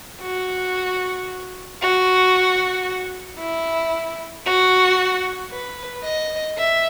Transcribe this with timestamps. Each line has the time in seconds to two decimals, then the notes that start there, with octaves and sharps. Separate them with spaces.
0.22 F#4
1.82 F#4
3.39 E4
4.46 F#4
5.51 B4
6.04 D#5
6.57 E5